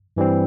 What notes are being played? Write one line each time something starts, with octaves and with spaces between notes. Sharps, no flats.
G2 E3 G3 C4